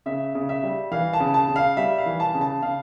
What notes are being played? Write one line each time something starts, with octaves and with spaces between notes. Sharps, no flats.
C#3 E5
C#3
E5
G3
E3 F5
A5
C#3
A5
C#3
F5
G3 E5
F5
E3
A5
C#3
A5
C#3 F5